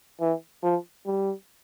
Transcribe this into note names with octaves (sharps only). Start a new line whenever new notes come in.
E3
F3
G3